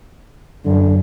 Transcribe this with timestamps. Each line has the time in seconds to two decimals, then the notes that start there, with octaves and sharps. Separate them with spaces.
0.65 F#2 D3